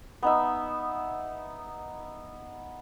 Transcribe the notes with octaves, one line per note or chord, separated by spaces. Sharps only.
B3 D#4 E5